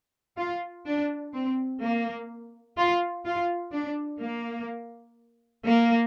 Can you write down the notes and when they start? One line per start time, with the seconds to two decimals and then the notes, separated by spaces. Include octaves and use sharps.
0.37 F4
0.85 D4
1.33 C4
1.81 A#3
2.78 F4
3.25 F4
3.73 D4
4.21 A#3
5.65 A#3